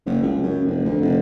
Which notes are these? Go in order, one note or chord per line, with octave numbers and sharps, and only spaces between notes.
F#1
C#2
F#2
F1
D2
F1